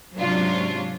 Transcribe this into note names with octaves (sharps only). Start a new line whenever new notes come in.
G#2 C3 F#3 C#4 D4 F4